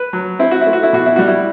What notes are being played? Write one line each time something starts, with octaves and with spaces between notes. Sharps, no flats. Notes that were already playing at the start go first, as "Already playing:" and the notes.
Already playing: B4
F#3
C4 E4
F#4
E4
A3
F#4
E4
B2 F#4
E4
G3 F#4
E4